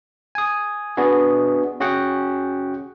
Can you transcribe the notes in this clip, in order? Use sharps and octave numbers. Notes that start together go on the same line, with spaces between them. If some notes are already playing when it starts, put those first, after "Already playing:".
G#5 D#6
B3 D4 F#4 G#4
C#4 F#4 G#4 F#5 G5